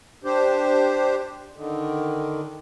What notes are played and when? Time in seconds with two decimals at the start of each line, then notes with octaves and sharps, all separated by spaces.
0.24 D4 G4 C5
1.56 D3 D#3